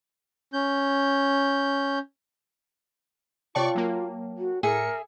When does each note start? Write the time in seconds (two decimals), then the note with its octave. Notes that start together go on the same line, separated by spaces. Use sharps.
0.53 C#4 G6
3.55 C3 F4 C#5 D5 G5 A5 C#6
3.75 F#3 A#3
4.38 F#4
4.63 A2 G#4 A#4 E5 C#7